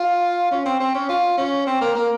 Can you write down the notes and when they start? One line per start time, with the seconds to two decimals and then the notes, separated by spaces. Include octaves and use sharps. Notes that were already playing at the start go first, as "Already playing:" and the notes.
Already playing: F4
0.51 C#4
0.65 C4
0.80 C4
0.95 C#4
1.09 F4
1.37 C#4
1.66 C4
1.81 A#3
1.95 A#3